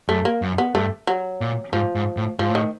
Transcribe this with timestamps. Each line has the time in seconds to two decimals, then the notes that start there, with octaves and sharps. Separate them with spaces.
0.09 F#2 A3
0.25 A#3
0.42 F#2
0.58 B3
0.75 G2 A3
1.07 F#3
1.41 A#2
1.73 G#2 F3
1.95 G#2
2.17 A2
2.39 G#2 F3
2.50 A2 D#3